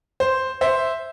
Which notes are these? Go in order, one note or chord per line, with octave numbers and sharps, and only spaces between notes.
C5
C5 E5